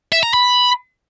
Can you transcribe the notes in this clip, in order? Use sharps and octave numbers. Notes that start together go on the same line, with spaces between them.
E5
A#5
B5